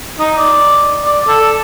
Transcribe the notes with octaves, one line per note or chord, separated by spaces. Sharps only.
D#4
D5
D5
A4